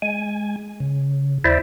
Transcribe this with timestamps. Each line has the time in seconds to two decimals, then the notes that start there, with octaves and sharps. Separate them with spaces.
0.02 G#3 G#5
0.80 C#3
1.44 D#2 E4 C5 D5 E5